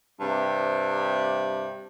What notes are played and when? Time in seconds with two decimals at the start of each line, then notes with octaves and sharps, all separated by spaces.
0.20 G2 C3